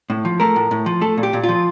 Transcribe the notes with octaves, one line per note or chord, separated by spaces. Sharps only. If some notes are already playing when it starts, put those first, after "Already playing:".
A2
F3
A3 A#4
A2
A2
F3
A3 A4
A#2
G4
A#2
F4
F3